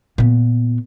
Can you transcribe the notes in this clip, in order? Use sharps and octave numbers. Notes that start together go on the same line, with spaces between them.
A#2 B3